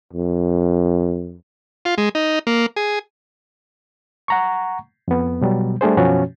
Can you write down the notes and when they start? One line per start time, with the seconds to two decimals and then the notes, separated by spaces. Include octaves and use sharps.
0.13 F2
1.85 F4
1.98 G#3
2.15 D#4
2.47 A#3
2.76 G#4
4.28 F#5 A#5 C#6
5.08 F2 B3
5.41 B2 F#3 G3
5.81 G3 A3 D4 G#4 C5
5.97 F#2 B2 F3 C#4 F#4 C#5